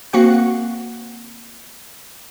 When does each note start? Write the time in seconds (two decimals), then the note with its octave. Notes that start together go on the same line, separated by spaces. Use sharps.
0.13 A#3 C4 F#4 F#5 F#6